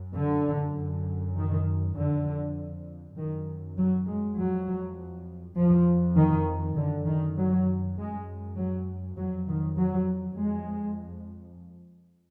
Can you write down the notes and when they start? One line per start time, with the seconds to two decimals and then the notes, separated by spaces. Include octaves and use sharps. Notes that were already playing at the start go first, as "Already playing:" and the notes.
Already playing: F#2
0.17 D3
0.77 F#2
1.37 D#3
1.97 F2 D3
3.17 F#2 D#3
3.77 F#3
4.07 G#3
4.37 F2 F#3
5.57 F2 F3
6.17 D#3
6.77 F#2 D3
7.07 D#3
7.37 F#3
7.97 F#2 G#3
8.58 F#3
9.17 F2 F#3
9.48 D#3
9.78 F#3
10.38 F2 G#3